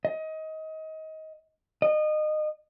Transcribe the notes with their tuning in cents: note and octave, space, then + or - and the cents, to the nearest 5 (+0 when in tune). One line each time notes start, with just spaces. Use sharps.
D#5 +25
D#5 -25